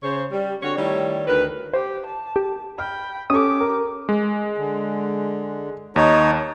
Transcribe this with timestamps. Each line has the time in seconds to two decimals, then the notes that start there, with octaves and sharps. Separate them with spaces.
0.03 C#3 C5 C#5
0.32 G3
0.63 D3 C4 F#4 C#5
0.76 D#3 G3 A3 E4 C#5 D5
1.26 D2 D#3 A#4 B4
1.73 G4 C5
2.06 A5
2.36 G4
2.78 G5 B5 F6
3.30 C#4 G4 A4 D6 D#6
3.60 A#4
4.09 G#3
4.58 D3
5.96 D#2 D#4 C#5